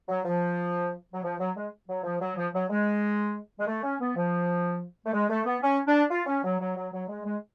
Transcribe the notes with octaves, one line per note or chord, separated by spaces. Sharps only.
F#3
F3
F#3
F3
F#3
G#3
F#3
F3
F#3
F3
F#3
G#3
G#3
A3
C#4
B3
F3
A3
G#3
A3
B3
C#4
D4
F4
C#4
F#3
F#3
F#3
F#3
G#3
G#3